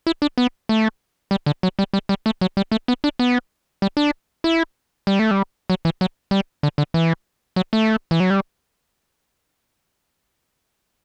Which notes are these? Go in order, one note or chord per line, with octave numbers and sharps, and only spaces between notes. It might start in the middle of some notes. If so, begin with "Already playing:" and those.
E4
D4
B3
A3
G3
D3
F#3
G3
G3
G3
A3
F#3
G3
A3
B3
D4
B3
G3
D4
E4
G3
A3
G3
F#3
E3
F#3
G3
D3
D3
E3
F#3
A3
E3
F#3
G3